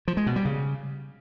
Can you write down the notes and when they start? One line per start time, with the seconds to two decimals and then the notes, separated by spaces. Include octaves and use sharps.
0.08 F3
0.17 G#3
0.26 B2
0.36 G3
0.45 C#3